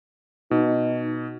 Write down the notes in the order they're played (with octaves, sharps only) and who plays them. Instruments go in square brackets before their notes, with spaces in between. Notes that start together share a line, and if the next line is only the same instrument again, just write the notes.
[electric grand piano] B2 [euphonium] D#4